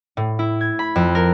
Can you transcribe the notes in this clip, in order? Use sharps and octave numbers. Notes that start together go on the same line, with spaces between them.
A2
E4
G#6
B5
F2
A#4